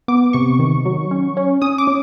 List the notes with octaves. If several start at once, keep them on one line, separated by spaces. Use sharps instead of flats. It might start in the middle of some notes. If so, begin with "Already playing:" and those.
B3 D6
C3 C#6
D#3
F#3
C#4
C#4
C#4 D#6
D6
C#4